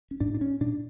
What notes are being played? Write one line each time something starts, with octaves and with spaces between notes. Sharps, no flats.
C#4
A2 D4
D4
C#4
A#2 D4